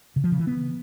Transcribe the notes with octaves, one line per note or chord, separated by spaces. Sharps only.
C#3
F3
C#3
E3
B3